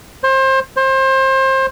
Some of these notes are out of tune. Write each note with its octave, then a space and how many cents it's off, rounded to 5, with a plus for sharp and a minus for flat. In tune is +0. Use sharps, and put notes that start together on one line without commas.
C5 +30
C5 +30